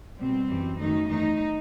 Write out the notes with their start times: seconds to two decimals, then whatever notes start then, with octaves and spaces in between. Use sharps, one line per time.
0.18 B2 G3 C4
0.49 F#2 E3 G3
0.79 F#2 D#3 A3 D#4
1.09 E2 D#3 A3 D#4